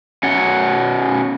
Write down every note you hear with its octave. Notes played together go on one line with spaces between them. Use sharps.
B2 C#4 F#5